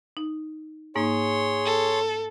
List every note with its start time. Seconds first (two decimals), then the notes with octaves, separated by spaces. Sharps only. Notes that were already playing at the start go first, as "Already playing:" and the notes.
0.17 D#4
0.96 G#2 A#3 D#4 G#4 C#5 C6
1.65 A4